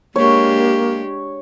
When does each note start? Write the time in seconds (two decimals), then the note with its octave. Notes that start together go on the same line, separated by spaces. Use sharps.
0.16 G#3 A#3 D4 G4 C#5